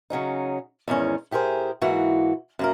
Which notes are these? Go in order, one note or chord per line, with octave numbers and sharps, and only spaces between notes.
C#3 F#3 C#4 D#4
E2 G#2 D#3 C#4
A2 G4 G#4 A#4 C5
G#2 E3 A#3 F#4
F#2 A#3 A#4